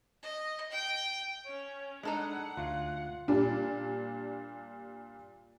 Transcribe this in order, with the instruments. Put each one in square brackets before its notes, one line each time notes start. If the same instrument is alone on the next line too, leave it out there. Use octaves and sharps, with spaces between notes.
[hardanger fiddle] D#5
G5
[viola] C#4 [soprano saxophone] C#5
[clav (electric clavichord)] G#3 [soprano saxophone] D4 [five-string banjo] D#4 A4 B5 [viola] F#5
[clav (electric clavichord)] D2 [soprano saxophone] F4
[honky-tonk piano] A#2 G3 D4